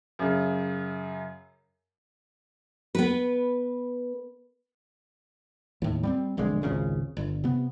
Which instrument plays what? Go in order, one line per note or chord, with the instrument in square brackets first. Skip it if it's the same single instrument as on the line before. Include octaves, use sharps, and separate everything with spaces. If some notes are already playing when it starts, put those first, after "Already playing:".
[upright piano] F#2 C#3
[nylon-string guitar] B3 B4
[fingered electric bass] D#2 A2
G3 B3 C4
E1 A#1 D3 G#3
G#1 C#2 C#3
G1
C3 B3